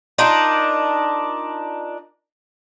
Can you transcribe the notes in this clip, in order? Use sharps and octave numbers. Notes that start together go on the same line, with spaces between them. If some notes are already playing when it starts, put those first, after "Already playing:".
D4 D#4 F4 A#4